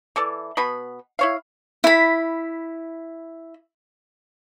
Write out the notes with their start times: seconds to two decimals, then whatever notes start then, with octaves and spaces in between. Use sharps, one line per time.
0.16 E3 A4 D5
0.57 B2 B3 B5
1.19 E4 C#5 F5
1.84 E4 B5